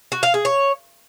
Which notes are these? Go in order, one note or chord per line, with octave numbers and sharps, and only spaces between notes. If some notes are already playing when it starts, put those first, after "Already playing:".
F#4
F5
G#4
C#5